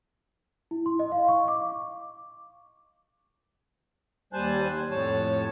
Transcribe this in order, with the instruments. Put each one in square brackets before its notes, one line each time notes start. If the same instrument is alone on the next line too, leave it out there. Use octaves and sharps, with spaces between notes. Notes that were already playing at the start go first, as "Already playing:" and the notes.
[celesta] E4
C6
D#5
F5
C#6
D6
[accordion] D#2 G3 C5 G#5 A5 F#6
F2 A2 C#5 A5